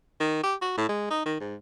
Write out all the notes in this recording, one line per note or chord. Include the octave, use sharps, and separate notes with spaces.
D#3
G4
F#4
A2
G#3
D#4
D#3
G#2